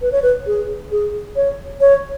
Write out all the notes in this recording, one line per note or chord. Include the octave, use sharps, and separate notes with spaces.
B4
C#5
B4
G#4
G#4
C#5
C#5